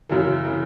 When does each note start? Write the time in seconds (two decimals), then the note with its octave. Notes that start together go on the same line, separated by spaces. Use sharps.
0.09 F#2 C#3 E3
0.45 C#3 E3